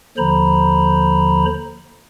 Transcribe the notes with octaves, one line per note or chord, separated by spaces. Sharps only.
D#2 D3 F3 C5 A#5 B5